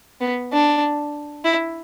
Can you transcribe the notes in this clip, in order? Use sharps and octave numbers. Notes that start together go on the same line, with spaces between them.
B3
D4
E4